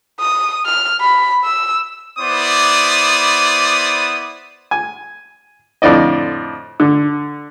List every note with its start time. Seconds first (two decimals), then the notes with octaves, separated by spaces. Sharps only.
0.21 D#6
0.66 F6
1.01 B5
1.44 E6
2.19 B3 E4 C5 D5 D6 D#6
4.71 G#5
5.82 F2 A2 D3 D5 D#5
6.80 D3